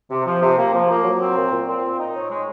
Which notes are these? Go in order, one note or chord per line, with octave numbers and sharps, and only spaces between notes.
C3
F3
C3
A#3
F3
A#3
F#3
C4
A#2
A#2
C4
A#2
D#4
C#5
G#3